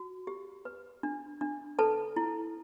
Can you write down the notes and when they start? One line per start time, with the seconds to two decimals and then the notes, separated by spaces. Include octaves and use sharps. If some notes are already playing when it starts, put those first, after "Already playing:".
Already playing: F#4
0.27 G4
0.65 B4
1.03 D4
1.41 D4
1.79 A4 B4 A5
2.16 E4